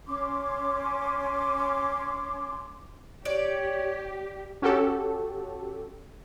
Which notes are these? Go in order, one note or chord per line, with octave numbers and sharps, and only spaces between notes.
C#4 C6 D6
G4 C#5 D5
C#4 F#4 G4 A4